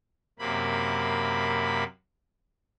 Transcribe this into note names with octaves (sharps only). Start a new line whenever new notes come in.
F#2 C3 A#3 B5